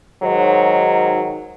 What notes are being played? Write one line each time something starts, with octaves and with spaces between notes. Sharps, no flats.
G#2 D#3 F#3